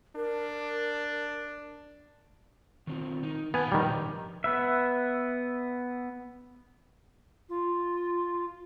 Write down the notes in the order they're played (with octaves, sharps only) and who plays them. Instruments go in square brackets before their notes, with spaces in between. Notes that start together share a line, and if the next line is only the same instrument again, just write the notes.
[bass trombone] D4 [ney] A#4
[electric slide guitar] D#3 C4 F4
D#3 D#4
[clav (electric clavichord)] B3 G#5 [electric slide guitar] F5 F#5 A5
[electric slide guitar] G#2 F3 A#4 [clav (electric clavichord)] D#3 G3
[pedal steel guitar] B3 B4 E5
[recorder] F4